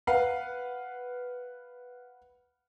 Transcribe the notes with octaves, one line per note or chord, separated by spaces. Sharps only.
B4 F5 F#5